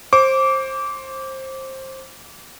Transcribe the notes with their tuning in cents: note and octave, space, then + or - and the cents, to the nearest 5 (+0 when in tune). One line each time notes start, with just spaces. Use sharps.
C5 +20 D6 -20